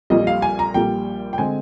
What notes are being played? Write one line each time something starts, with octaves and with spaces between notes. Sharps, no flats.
A#1 A#2 G3 D#5
F5
G#5
A#5
A#1 A#2 G3 G5
G5
D3 G#3 C4 G#5